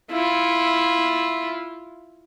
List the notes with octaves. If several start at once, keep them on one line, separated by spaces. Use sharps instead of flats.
E4 F4